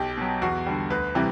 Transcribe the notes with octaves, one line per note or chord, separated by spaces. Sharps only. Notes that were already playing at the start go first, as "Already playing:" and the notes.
Already playing: B1 G4
B2 F#3
E2 F#4
D3 G3
D2 B4
C3 E3 G3